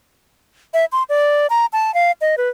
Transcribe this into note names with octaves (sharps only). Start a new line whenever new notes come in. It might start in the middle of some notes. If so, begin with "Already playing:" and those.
E5
C6
D5
A#5
A5
F5
D#5
B4